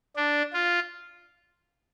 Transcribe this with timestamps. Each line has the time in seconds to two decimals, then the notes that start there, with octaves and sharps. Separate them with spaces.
0.16 D4
0.53 F4